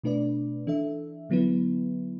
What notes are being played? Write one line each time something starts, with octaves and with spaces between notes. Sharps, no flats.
B2 A3 D4 B4 D5
E3 D4 A4 E5
D3 F#3 B3 E4 B4